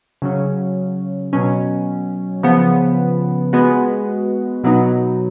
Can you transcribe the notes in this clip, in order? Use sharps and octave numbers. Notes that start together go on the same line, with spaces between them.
C#3 F#3 C#4
B2 F#3 C#4
C#3 F3 B3
G#3 B3 F#4
B2 F#3 B3 D#4